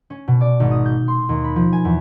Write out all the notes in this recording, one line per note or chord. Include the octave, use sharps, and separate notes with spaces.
C#4
B2
D5
G#1
D#6
G6
C6
D#2
B5
F3
G#5
E2